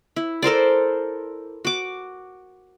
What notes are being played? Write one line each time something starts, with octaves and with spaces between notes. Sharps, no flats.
E4
A4 A#4 C5 D5
F#4 D6